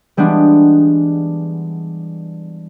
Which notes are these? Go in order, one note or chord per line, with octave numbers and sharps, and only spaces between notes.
E3 G3 G#3 B3 D4